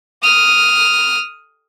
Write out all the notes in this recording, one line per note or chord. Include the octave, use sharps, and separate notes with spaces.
D#6 F6